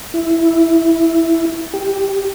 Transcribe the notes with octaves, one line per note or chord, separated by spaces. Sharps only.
E4
G4